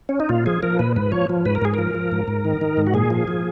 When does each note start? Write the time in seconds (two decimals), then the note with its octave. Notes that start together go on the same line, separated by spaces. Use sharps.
0.09 C#4
0.20 D#4
0.29 A#2 F4
0.46 F3 G#4
0.63 F3 A#4
0.79 A#2 B4
0.96 G#2 B4
1.12 F3 C#5
1.29 F3
1.45 G#2 B4
1.55 A#4
1.62 G#2 G#4
1.74 F3 A#4
1.95 F3
2.12 G#2
2.28 G#2
2.45 D#3
2.61 D#3
2.77 G#2
2.87 F#4
2.94 A#2 G#4
3.10 F3
3.28 F3